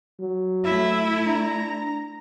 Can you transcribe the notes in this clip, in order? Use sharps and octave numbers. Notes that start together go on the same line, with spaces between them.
F#3
A3 E4 E5
D4 A#5